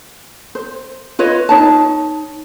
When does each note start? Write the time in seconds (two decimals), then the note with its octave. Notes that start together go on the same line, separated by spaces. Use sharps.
0.55 C5
1.19 F4 B4 C#5 D#5
1.49 D#4 C#5 A5